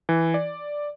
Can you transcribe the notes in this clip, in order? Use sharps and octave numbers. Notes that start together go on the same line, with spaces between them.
E3
D5